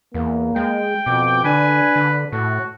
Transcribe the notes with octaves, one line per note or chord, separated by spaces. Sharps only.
E2 A#3
G#3 G5
F2 B2 D6
D3 D4 B4 G#5
D3
A2 F#4 A4